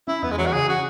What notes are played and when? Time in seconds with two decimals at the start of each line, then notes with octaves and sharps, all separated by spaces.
0.08 C#4 E4
0.22 E2 B3
0.31 G#3
0.38 E3 F#3
0.47 F#4
0.53 C#3 G#4
0.68 C#4 F#4